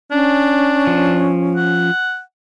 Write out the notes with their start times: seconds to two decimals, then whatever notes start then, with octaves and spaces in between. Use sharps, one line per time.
0.11 C#4 D4
0.87 F3
1.56 F#5